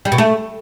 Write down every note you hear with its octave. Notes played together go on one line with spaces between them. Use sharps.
G3
B2
A3